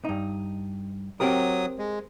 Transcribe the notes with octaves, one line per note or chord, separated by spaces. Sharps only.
G2 D#4
F#3 C4 G4 A#4 D#6
G#3